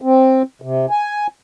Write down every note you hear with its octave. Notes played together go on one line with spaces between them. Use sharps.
C4
C3
G#5